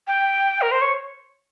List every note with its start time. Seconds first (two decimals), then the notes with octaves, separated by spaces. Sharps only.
0.07 G5
0.62 A#4
0.71 C5
0.82 C#5